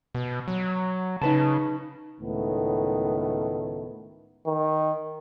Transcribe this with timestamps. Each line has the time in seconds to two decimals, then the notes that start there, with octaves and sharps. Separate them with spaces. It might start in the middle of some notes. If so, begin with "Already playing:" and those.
0.15 B2
0.48 F#3
1.22 C#3 D#4 B4 A5
2.20 C#2 A2 D#3 A3 B3
4.46 D#3